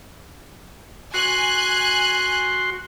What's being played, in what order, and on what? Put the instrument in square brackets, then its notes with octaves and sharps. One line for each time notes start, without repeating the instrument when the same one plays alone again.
[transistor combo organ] F#4 C6 [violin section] G#5 F#6